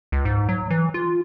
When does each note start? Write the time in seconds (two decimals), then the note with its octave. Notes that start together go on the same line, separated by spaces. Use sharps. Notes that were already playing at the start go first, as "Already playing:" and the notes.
0.12 C#2
0.25 G#2
0.49 F#3
0.70 E3
0.94 F4